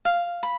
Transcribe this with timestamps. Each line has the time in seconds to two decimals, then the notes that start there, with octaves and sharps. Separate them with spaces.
0.05 F5
0.43 B5